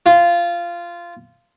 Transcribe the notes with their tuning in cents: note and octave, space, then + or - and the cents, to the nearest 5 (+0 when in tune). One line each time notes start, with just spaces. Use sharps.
F4 -15